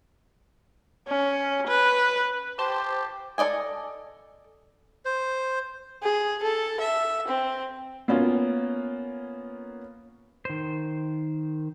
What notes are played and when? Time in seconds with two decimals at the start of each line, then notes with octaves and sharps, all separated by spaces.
1.08 C#4
1.67 B4
2.59 G4 C5 A5 C6
3.38 A4 C5 D5 D#5 G#5
5.05 C5
6.02 G#4
6.42 A4
6.80 E5
7.28 C4
8.08 A#3 B3 C#4 F4
10.45 D#3 C5